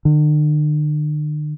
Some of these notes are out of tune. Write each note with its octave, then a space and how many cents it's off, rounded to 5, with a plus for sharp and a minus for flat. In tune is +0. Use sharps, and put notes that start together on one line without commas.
D3 +45